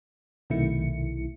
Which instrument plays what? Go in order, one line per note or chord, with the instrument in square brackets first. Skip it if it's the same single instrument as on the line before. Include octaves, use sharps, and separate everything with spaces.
[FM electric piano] B1 C3 D#3 A3 E4 C#7